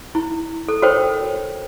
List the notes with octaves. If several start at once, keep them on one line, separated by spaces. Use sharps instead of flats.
E4
A4
F#4 A4 A#4 C5 C#5 G5